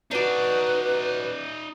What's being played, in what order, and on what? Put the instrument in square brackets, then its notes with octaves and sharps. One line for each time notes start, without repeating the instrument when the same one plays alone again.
[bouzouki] D4 F#4 [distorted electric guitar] D#4 D5 [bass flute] B4